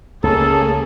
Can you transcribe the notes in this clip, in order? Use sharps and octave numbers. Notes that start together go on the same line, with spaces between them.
C#2 A#3 C#4 G#4 A4 A5